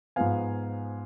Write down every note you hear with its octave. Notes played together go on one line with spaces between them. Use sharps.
G#2 F3 B3 F5 G#5